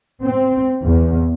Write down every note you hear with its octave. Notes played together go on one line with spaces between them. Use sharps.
C4
E2